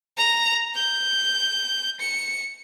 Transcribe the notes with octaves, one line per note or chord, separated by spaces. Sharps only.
A#5
G6
C#7